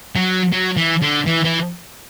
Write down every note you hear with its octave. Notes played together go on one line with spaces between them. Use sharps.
F#3
F#3
E3
D3
E3
E3